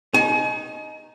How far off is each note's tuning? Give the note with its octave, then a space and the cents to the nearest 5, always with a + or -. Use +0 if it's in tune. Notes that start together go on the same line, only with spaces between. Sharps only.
D#4 +0 G#5 +40